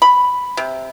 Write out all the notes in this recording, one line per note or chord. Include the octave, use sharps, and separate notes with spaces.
B5
C3